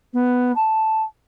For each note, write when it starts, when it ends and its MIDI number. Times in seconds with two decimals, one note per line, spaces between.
0.13 0.52 59
0.55 1.02 81